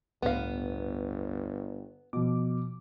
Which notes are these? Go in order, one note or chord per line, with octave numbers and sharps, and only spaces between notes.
G1 C#2 A2 B3 F5
B2 F3 D6